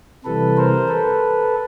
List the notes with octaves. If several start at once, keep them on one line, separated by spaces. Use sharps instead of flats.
C3 E3 G3 A4 B4
A#4 C5
A4 B4